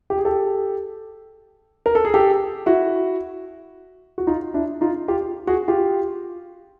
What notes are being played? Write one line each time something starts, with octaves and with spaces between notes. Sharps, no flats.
G4
G#4
G4 A4
A#4
A4
G#4
G4 A4
E4 F#4
F#4
D#4 F4
D4 E4
D#4 F4
F4 G4
F#4 G#4
F4 G4